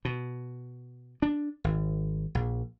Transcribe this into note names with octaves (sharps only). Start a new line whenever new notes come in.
B2
D4
G#1
A#1